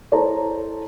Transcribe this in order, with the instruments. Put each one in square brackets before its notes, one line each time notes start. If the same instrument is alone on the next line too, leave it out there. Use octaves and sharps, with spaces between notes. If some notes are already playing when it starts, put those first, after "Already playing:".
[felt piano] E4 A4 C5 C#5 A5 A#5